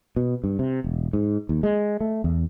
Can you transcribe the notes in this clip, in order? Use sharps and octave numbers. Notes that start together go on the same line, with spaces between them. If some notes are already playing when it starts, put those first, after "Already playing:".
B2
G2
C3
E1
G#2
D#2
G#3
A3
E2